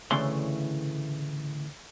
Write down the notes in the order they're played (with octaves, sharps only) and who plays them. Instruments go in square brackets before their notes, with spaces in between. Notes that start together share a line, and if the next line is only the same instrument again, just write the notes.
[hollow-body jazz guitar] D2 A2 C#3 E3 D5 C6